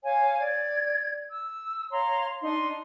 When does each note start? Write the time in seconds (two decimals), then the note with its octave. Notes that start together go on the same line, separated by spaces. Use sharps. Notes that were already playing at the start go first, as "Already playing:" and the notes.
0.05 C#5 F5 G#5
0.40 D5 G#6
1.31 E6
1.92 C#5 F5 A#5 C6
2.42 D4 D#4 C6